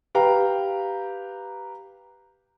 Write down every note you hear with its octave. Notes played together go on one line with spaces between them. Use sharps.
G4 B4 F5 G5 A#5